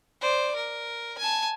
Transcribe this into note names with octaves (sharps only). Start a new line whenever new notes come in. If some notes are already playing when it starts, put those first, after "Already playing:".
C5 D5
A#4
G#5 A5